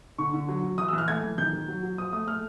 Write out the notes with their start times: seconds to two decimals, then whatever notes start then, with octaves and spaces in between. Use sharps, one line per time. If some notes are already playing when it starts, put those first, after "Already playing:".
0.18 D3 C#6
0.34 D3
0.48 F#3
0.63 F#3
0.78 E3 D#6
0.88 E3 E6
0.98 F6
1.08 A3 G#6
1.23 E3
1.38 D#3 G6
1.53 D#3
1.68 F#3
1.83 F#3
1.98 F3 D#6
2.12 A3 D#6
2.27 A3 F6